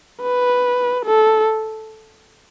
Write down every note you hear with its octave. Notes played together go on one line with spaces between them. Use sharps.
B4
A4